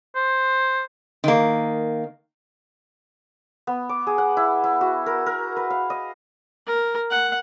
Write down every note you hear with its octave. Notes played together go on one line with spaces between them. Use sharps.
C5
D#3 A#3
B3
D6
G#4
F#5
E4
E4
F#4
A#4
A#4
B4
F5
D#5
A#4
F#5